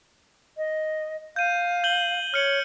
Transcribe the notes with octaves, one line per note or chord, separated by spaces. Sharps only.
D#5
F5 G6 D#7
G6 F#7 G7
C#5 F6 C#7 F#7